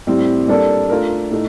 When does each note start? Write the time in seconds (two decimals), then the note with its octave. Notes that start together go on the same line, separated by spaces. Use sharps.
0.07 A2 G3 C4 G4
0.48 G3 A#3 D4 A4 D5
0.90 A3 D4 F4 A#4
1.31 A2 A3 D#4